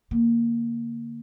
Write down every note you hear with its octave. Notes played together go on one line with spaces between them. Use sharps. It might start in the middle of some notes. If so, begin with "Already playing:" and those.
D3 A#3